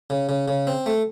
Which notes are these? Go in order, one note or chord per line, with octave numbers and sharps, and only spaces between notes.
C#3
C#3
C#3
C4
A3